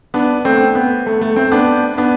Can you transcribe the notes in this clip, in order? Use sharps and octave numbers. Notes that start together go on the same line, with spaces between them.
B3 D4
A3 C4
B3
A3
A3
A3 C4
B3 D4
B3 D4